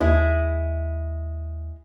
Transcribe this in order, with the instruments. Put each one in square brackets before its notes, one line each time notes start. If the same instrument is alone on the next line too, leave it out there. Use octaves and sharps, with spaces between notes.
[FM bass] D#2 [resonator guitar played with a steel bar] G#3 E4